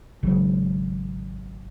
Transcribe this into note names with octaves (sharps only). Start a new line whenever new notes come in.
G#1 C#3 F#3